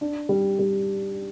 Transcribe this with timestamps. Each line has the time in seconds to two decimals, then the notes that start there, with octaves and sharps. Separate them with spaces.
0.01 D4
0.29 G3
0.59 G3